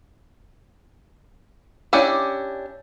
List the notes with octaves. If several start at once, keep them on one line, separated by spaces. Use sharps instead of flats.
C#4 D4 E4 G4 D5